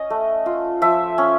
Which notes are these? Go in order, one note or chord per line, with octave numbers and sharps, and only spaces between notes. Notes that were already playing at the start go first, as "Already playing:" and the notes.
Already playing: C#4 D#5
A3
F4
F3 E5
C#4